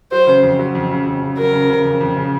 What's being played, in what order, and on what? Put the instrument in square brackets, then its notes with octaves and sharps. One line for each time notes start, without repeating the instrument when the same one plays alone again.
[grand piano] F#3 [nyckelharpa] C5
[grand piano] C#3
F2
F#3
F2
C#3
F2
C#3
[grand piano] F#3 [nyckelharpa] A#4
[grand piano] C#3
C#3
F2
F2
C#3